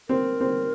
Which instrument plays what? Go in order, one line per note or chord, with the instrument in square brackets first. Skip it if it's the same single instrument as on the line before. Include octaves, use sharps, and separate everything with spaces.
[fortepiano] C4 [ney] A#4
[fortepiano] C4